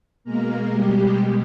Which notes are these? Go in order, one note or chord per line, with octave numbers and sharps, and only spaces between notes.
B2 G#3 A#3 A#4
G3 G4